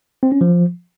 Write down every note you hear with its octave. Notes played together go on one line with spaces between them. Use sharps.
C4
C#4
F3